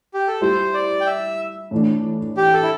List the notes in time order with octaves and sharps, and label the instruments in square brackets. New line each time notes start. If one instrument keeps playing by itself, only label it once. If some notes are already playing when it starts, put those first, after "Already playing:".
[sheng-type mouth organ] G4
A4
[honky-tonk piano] G3 E4 G4 [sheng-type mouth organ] C5
[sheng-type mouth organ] D5
G5
E5
[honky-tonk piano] A2 E3 A3 D4
[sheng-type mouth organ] G4
A4
E4